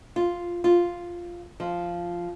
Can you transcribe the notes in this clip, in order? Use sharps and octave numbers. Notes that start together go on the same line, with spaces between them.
F4
F4
F3